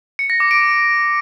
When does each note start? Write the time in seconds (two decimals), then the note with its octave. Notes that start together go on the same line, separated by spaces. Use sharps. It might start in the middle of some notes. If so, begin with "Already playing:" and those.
0.19 C#7
0.30 A#6
0.40 D6
0.51 D7